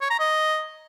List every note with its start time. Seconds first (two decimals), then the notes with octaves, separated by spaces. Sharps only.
0.01 C#5
0.10 A#5
0.19 D#5